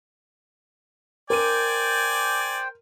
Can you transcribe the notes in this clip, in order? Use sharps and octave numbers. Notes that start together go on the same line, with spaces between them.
A#4 C5 D5 G5 G#5 D#7